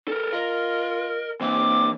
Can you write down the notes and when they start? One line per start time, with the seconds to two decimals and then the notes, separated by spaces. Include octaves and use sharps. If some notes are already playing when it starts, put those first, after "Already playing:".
0.08 A4 A#4
0.33 F4 A#4 D#5
1.41 E3 A#3 C4 D6